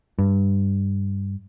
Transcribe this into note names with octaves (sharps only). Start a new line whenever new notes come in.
G2